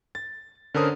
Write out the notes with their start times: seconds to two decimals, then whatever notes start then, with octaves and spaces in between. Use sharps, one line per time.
0.15 A6
0.74 D3 C#4 A4 A#4 C5 D#6